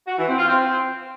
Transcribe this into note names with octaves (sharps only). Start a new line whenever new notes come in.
F#4
E3
C4
F4
C4